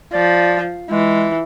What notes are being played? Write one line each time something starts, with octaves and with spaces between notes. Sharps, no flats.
F3 D5
E3 G#3